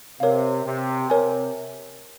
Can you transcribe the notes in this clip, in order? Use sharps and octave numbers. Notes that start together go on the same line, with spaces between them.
C3 A#4 C#5 F5
C3
C3 A#4 C#5 G#5